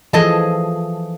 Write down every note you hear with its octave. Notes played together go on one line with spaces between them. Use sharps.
E3 F3 G#4 A4 D#5 A5